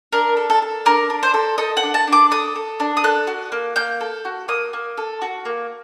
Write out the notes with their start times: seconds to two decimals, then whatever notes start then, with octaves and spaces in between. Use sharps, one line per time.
0.13 D4 A#4
0.37 A4
0.50 A4
0.62 A4
0.86 D4 A#4
1.10 D4
1.23 C5
1.34 A4
1.58 A4 D#5
1.77 F#5
1.83 D4
1.94 A5
2.07 D4
2.13 D6
2.31 A4 D#6
2.56 A4
2.80 D4
2.97 D#6
3.04 A4 F#6
3.27 F#4
3.52 A#3
3.76 A#3 G6
4.01 A4
4.25 F#4
4.48 A#3 D#6
4.73 A#3
4.98 A4
5.22 F#4
5.45 A#3